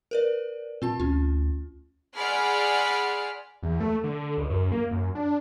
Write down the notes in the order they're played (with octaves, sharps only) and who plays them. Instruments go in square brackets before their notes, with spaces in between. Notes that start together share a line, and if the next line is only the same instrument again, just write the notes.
[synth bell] A#4 B4 D5
[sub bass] A#2 [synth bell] C4 F4 A5
[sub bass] D2 [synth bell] C#4 F4
[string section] G#4 D5 F#5 B5 C6 F6
[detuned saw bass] E2
A3
D3
C#2
F#2
A#3
F#2
D4